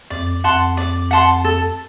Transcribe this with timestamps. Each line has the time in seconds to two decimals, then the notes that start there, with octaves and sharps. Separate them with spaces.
0.10 F2 D5
0.44 F2 F#5 A5 C6
0.77 D5
1.11 F#5 A5 C6
1.44 A4